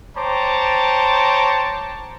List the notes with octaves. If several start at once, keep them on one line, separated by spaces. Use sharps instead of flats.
C5 C#5 G5 A5 A#5 D6